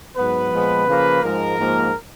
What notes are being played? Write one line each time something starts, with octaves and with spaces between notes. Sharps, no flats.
G#2 F#3 B3 B4
A#2 F3 G#3 B3
C#3 F3 A#3
G#2 F3 G#3 A#4
G#2 F3 A#3